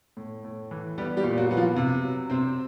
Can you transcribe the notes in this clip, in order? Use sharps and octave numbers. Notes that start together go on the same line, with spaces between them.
A2
A2
E3
G3 B3 G4
G3 G4
A#2
F#3 F#4
B3 F#4
F3 F4
C3
F#3
C3 C4 C5